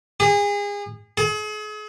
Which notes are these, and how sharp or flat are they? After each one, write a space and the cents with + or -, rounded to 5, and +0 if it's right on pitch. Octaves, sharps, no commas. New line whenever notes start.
G#4 -30
G#4 +40